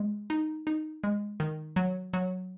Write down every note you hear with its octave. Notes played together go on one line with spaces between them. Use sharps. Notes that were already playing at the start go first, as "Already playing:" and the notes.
Already playing: G#3
D#4
D#4
G#3
D#3
F#3
F#3